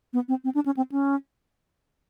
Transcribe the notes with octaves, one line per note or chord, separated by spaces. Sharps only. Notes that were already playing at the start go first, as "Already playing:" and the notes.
B3
C4
C4
D4
C#4
C4
C#4